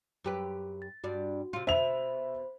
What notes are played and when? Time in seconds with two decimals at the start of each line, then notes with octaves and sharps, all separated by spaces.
0.24 F#2 G4 B4
0.82 A6
1.04 G2 F#4 D5
1.53 C3 F4
1.67 B2 C5 E5 B5 F7